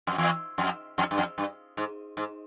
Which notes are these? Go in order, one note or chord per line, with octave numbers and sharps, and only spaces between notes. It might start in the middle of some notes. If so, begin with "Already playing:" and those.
F2
E2
F2
F2
G2
F2
G2
G#2
G#2